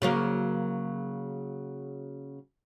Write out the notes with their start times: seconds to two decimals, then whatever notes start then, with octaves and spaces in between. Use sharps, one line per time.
0.02 C#3 F#3 A#3